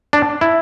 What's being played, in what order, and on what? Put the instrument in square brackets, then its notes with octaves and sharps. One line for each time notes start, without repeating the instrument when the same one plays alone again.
[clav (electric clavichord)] D4
E4